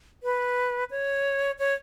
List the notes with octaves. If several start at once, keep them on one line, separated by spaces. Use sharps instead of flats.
B4
C#5
C#5